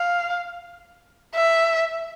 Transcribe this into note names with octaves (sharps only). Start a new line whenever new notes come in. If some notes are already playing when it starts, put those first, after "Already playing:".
Already playing: F5
E5